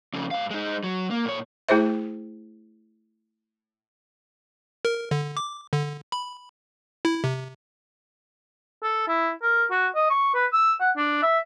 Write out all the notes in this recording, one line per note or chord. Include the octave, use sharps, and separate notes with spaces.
F2 C#3
G#2 F5
G#3 D#4
F#3
A#3
A#2 C#5
A3 E4 G#4 C5 E5
A#4
D3
D6
D3
B5
E4
C3
A4
E4
A#4
F#4
D#5
C#6
B4
E6
F#5
D4
E5